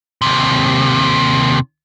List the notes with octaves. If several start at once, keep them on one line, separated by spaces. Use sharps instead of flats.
D#2 C3